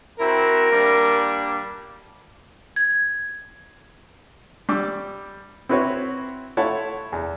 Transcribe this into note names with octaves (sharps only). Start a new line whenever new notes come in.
C4 E4 F#4 A#4
G3 A#3 D4
G#6
G3 D6 E6
C4 E4 F#4 B4 C#5
A3 E4 F4 C#5 F#5 A5
E2